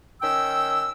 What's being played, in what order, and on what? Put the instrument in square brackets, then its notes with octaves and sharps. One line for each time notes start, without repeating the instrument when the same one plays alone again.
[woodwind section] D#3 C#4 G5 E6